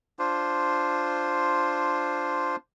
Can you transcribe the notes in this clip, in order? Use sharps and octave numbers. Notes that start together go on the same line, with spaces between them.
D4 F4 C5